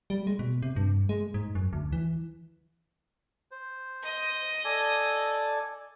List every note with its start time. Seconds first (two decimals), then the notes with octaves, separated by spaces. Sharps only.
0.10 G3
0.27 G#3
0.39 B2
0.62 C3
0.76 G2
1.09 G#3
1.34 G#2
1.55 F#2
1.73 D2
1.92 E3
3.51 C5
4.03 D#5
4.65 A4 D5 G#5